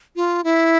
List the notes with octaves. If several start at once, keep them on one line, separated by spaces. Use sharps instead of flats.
F4
E4